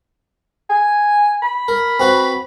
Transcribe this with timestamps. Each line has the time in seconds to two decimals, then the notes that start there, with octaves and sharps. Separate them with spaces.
0.70 G#5
1.43 B5
1.68 A#4
1.99 C4 F#4 B4